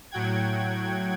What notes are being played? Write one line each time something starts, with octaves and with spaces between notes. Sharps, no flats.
A2 F#3 F#5 G5 G#6